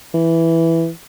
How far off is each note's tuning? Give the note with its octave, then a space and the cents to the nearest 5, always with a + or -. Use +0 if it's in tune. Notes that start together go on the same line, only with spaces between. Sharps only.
E3 +0